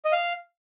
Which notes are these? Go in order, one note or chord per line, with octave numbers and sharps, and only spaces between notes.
D#5
F5